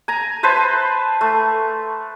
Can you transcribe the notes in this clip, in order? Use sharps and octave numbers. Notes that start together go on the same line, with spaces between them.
G#5 A#5
B4 C5 E5 A5
A3